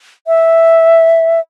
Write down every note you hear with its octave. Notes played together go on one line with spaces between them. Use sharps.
E5